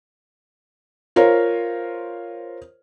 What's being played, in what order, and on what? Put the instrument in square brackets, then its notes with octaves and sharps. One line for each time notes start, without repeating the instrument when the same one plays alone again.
[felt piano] F4 A#4 C5 C#5